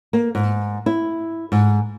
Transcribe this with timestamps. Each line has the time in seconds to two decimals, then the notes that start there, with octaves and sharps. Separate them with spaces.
0.13 A#3
0.35 G#2
0.86 E4
1.52 G#2